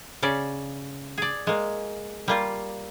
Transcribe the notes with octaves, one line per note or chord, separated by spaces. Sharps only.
C#3 C#4 D5
G#4 D5
G#3 A#3
G3 A#3 F4